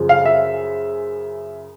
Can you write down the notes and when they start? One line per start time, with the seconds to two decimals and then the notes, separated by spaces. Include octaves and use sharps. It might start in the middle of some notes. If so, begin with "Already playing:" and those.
Already playing: F#2 C#3 F3
0.09 F5
0.25 E5